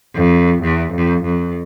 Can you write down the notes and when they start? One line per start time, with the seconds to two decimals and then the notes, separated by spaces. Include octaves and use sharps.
0.15 F2
0.62 E2
0.93 F2
1.24 F2